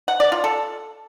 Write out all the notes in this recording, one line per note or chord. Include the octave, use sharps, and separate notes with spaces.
F#5
D5
F4
A4